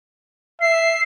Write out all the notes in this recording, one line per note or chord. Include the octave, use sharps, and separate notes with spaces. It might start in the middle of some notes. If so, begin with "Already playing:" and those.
E5 C7